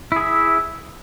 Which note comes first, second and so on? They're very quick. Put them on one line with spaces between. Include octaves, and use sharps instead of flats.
E4 G#4 E5